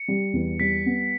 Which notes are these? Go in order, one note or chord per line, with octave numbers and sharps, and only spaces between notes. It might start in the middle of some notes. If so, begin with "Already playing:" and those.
Already playing: C#7
G3
E2
G3 B6
B3